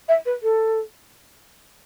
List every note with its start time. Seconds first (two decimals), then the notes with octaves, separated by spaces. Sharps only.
0.09 E5
0.26 B4
0.43 A4